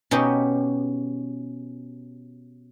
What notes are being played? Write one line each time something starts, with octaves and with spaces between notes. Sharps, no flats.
B2 C#4 D#4 G4